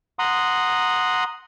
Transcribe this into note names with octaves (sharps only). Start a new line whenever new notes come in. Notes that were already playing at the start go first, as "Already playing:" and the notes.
F#5 A#5 C6 D#6